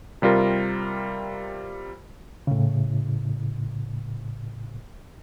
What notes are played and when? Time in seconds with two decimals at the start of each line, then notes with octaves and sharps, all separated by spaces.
0.22 C3 G3 F4 A#4
2.47 A2 C#3